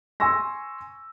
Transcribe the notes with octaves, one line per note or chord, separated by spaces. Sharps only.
G#5 C6 C#6 E6 A#6